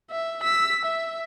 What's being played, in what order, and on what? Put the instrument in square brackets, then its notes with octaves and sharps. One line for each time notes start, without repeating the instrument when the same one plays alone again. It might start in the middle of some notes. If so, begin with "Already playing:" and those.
[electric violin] E5
E6 B6
E5